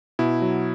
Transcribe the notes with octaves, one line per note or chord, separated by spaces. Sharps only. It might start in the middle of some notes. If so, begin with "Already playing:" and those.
B2 E4
F#3